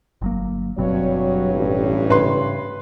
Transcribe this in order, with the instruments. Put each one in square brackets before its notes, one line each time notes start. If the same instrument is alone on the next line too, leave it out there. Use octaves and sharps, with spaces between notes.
[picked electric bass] G1 F#3 A#3
[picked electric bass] F#1 B2 C4 [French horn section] G2 C#5 [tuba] F#3
[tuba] A1
[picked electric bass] G#2 C#3 [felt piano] B4 C6